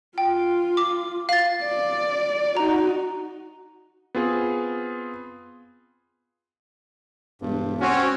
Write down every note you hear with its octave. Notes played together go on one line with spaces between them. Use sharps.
F4 G5
D6
F5 A6
D5
D#4 F#4 A#5
B3 C4 F4 G#4
E1 G2
C4 C#4 F#4